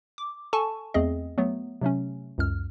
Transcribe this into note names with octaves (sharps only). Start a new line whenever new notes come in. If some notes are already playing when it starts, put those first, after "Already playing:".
D6
A4 G#5 A5 C#6
E2 A3 C4 G#4 D#5
F#3 A3 B3
C3 F#3 A3 C#4
C#2 F#2 F6